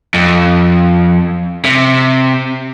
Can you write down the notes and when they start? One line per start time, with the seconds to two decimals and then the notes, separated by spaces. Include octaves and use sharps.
0.14 F2
1.65 C3